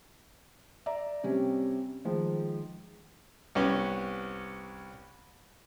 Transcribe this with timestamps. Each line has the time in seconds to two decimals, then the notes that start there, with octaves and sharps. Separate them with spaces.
0.86 D5 E5 A#5
1.23 C3 G3 C#4
2.05 D#3 F3 G#3
3.55 C2 B3 C#4